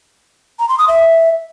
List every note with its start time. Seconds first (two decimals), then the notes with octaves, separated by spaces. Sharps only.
0.59 A#5
0.69 C6
0.78 D#6
0.88 E5